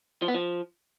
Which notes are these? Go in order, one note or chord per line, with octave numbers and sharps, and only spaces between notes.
F3
B3
F3